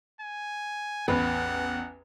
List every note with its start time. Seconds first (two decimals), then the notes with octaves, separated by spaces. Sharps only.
0.21 G#5
1.08 A1 E2 B4 F#5